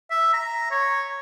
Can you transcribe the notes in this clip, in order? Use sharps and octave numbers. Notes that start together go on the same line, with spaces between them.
E5
A#5
C#5